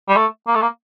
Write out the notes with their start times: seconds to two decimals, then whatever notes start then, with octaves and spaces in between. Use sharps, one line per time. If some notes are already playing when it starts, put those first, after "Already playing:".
0.09 G3
0.17 A3
0.48 A#3
0.55 A3
0.62 A#3